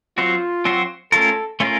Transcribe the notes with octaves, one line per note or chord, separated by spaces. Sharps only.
F#3 C4 F4 F#4 C5
F#3 C4 F#4 C5
A3 C#4 F4 A4 A#4
A3 C#4 F4 A#4